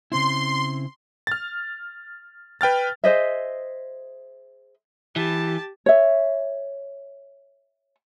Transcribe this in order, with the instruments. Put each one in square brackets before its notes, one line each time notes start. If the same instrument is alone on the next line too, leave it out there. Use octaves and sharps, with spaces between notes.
[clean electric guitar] C#3 C4 E4 [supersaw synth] C6
[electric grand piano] F6 A6
B4 G5 F6 A6
[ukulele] G#4 C5 D#5 E5
[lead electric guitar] E3 [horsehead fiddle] G4 A5
[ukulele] C#5 E5